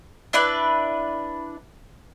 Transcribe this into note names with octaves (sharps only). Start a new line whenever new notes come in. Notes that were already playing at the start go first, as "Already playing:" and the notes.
D4 E4 B4 D5